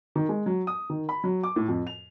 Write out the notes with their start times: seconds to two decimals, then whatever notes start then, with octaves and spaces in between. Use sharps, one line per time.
0.16 D#3
0.29 G#3
0.46 F#3
0.67 D#6
0.90 D#3
1.09 B5
1.24 F#3
1.43 D6
1.56 A2
1.68 F2
1.87 F7